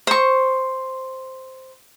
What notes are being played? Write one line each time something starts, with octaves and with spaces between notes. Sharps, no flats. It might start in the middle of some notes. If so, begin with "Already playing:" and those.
C5 C#6